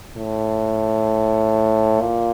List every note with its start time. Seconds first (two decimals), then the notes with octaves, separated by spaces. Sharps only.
0.17 A2
2.01 A#2